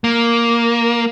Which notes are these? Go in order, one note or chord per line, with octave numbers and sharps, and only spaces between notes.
A#3